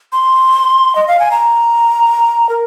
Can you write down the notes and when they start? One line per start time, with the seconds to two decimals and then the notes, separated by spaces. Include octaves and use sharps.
0.12 C6
0.95 D#5
1.08 F5
1.20 G#5
1.31 A#5
2.49 A#4